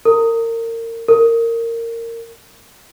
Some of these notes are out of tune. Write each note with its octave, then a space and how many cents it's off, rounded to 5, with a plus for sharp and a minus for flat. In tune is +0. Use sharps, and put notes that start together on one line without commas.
A#4 -30
A#4 -20